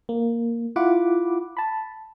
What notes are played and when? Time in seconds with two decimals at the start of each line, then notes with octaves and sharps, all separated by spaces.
0.09 A#3
0.76 E4 F4 F#5 B5 D6
1.57 A5 B5